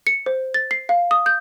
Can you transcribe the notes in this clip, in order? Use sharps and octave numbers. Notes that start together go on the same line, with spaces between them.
C#7
C5
A6
C7
F5
D#6
G6